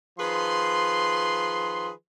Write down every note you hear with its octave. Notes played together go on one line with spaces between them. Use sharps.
D#3 F3 G#4 B4 C6